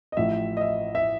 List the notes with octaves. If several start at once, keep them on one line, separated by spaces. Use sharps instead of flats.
D#5
A1 A2 F3 E5
D#5
E5
E5